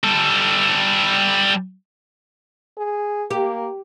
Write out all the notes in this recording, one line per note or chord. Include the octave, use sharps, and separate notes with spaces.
G3 A4
G#4
A#3 G4